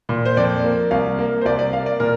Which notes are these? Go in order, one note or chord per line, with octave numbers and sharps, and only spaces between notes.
A#2
C5
F2 D5
A#3
C2 F5
A#3
C5
C2 D5
D5
A#3 F5
D5
A#2 A#4